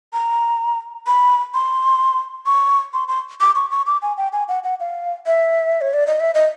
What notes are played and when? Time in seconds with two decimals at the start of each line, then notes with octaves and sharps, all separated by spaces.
0.13 A#5
1.07 B5
1.54 C6
2.46 C#6
2.94 C6
3.08 C6
3.41 D6
3.55 C#6
3.71 C#6
3.87 D6
4.02 G#5
4.17 G5
4.33 G#5
4.48 F#5
4.64 F#5
4.80 F5
5.26 E5
5.81 C#5
5.93 D5
6.07 D#5
6.20 E5
6.34 D#5